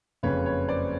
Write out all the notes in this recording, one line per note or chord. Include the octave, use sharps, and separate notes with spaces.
F#1 F2 C#3 B4 C#5
B4 C#5
C5 D5